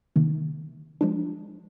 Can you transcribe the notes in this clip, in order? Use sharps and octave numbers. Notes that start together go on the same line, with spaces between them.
C3 D#3 A#3
F3 G#3 D4